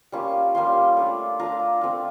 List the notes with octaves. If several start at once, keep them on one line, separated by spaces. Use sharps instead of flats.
G3 A#3 C#4 F4 C#6
G3 A#3 C#4 F4 C6
A3 D4 F4
A3 D4 F4 A#5
A3 C4 F4